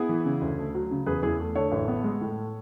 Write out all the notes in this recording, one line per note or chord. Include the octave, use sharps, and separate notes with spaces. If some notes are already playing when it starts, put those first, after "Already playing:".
Already playing: B3 E4 G#4
E3
C#3
D2
A3
F#3
C#3
E2 G#4 B4
E2 E4 G#4
A3
D3 A4 C#5
A1
B3
G#3
A2